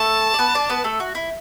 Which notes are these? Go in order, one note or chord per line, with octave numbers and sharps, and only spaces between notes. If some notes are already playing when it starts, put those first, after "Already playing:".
Already playing: A3 A4 A5
D5
B3 B4
D4 D5
B3 B4
A3 A4
F#4
E4